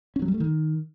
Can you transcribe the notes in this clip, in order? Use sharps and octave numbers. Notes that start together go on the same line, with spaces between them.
C#4
F#3
G3
A3
D#3